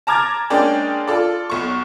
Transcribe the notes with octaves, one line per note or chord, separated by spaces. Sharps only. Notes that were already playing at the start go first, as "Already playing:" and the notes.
A5 A#5 D6 F6 G#6 A6
G#3 A#3 C#4 D4 D5 G5
F4 A4 D5
B1 C#6